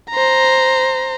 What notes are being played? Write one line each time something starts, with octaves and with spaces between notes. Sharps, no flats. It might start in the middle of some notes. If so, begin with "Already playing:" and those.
C5 A#5